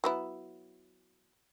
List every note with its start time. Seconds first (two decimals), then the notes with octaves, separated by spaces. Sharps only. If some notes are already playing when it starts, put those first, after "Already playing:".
0.04 F#3 B3 E4